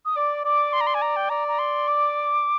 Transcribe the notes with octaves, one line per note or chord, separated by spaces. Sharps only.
D#6
D5 D6
D5 D6
C6
A#5
C6
G#5
A#5
G5
D5 A#5
A#5
C6
D6